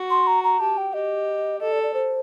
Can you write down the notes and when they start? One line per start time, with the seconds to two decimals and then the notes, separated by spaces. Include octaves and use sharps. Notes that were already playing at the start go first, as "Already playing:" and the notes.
Already playing: F#4
0.10 C6
0.27 A#5
0.44 A#5
0.60 G4 A5
0.78 G5
0.94 G4 D#5
1.60 A4 D#5
1.72 D5
1.83 D5
1.94 C5